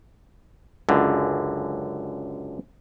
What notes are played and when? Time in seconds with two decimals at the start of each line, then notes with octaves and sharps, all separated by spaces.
0.89 C#2 F#2 D3